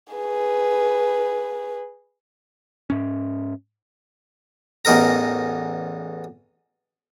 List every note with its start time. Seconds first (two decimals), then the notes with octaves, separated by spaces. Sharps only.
0.13 G#4 B4
2.90 G#2 C#4
4.85 A1 E2 D#4 A#4 A#5